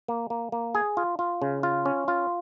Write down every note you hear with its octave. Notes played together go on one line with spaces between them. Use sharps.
A#3
A#3
A#3
G#4
F4
F4
C#3
F4
C#4
F4